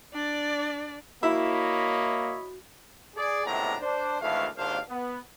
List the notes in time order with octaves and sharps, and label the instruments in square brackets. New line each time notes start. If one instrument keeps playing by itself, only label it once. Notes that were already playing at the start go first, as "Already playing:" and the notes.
[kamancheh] D4 D5
[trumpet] A#3 [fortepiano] E4 [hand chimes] F#4 [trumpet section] C#5 D#5 B5
[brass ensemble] G#4 D5
C#2 A2 C3 B3 D4 A#5
D4 C5
G#1 D2 E3 A3 F5
G#1 D#2 A#2 D4 C5 F5
B3